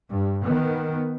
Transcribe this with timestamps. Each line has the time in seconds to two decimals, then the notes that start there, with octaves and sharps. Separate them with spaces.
0.10 G2
0.43 D#3 B3